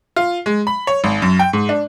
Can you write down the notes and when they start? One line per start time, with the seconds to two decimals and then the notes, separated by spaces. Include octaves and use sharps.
0.16 F4
0.46 G#3
0.67 B5
0.87 C#5
1.04 G#1
1.22 F#2
1.39 G5
1.53 G#2
1.69 D4